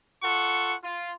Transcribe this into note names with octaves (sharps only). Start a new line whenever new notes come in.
F4 A4 F#5 C#6
F4